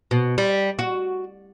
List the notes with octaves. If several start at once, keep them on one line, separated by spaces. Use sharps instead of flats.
B2
G3
F#4